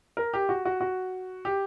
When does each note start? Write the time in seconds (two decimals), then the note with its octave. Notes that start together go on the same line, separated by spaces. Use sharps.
0.17 A#4
0.34 G4
0.49 F#4
0.65 F#4
0.81 F#4
1.45 G4